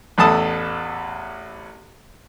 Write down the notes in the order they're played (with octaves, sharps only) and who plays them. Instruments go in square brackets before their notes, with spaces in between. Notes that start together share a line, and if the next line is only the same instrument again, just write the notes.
[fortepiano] A1 E2 A4 A5 D#6